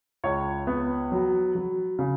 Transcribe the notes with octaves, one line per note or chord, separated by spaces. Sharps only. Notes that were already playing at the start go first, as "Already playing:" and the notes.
C#2 C#5
B3
F#3
F#3
C#3